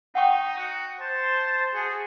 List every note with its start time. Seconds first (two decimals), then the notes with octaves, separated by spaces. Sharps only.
0.15 D#4 F#5 G5 C#6
0.58 F#4
1.00 C5 A5
1.74 F#4 G#4